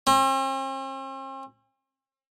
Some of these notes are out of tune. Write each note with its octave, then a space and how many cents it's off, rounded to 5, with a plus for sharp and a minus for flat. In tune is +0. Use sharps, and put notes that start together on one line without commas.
C4 +45